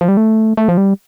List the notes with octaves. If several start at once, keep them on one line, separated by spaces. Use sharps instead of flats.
F3
G3
A3
A3
F3
G3